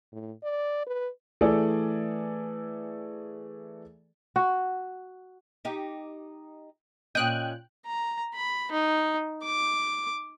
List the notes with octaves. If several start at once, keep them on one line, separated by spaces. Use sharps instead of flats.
A2
D5
B4
E3 A3 G#4 A4 D5
F#4
D#4 G4
A#2 C#4 D#5 G5 F#6
A#5
B5
D#4
D6